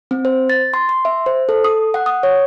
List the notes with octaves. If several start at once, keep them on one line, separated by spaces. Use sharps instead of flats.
C4
C5
A6
C6
C6
E5
C5
A4
D#6
F#5
D#6
C#5